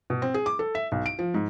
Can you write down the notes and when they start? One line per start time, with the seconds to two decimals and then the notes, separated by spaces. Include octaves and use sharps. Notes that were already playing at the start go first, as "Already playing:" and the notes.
0.10 B2
0.22 C4
0.34 G#4
0.46 D6
0.59 A4
0.75 E5
0.92 B1
1.06 D7
1.19 F3
1.34 G#2